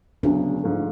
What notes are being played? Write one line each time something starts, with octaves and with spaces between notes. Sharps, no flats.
D2 C#3 F#3 B3 D4
G#2 F3 A3 D4